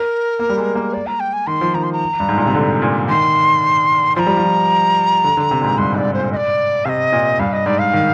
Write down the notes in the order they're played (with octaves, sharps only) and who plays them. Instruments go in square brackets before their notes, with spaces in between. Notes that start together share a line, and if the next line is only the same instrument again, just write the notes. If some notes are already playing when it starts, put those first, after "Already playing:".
Already playing: [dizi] A#4
[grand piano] A#3
G3
G#3
A#3
[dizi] D5
A#5
G5
G#5
[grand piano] D#3 [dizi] C6
[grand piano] F3
[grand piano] D#3 [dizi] A#5
[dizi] C6
A#5
[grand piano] G2
G#2
A#2
C3
D3
A#2
[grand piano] D#3 [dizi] C6
[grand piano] F3 [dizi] A#5 C6
[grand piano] G3
F3
D3
D3
C3
A#2
G#2
[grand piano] G2 [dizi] C6
[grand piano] G#2
[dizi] D5
[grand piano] G#2
[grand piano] A#2 [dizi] C5
[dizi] D#5
D5
[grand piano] C3 [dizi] F5
[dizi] D#5
[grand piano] A#2
[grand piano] G2 [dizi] F5
[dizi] D#5
[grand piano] G#2 [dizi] D5
[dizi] F5
[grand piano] D#3